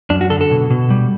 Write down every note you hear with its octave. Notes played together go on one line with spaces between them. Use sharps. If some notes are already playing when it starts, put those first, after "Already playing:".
F#2 D4
F#4
D3 A4
A4
B2
B2
G3